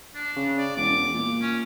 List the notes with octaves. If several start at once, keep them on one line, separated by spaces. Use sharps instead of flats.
D4
C#3
D5
E1 D6
A#2
C#4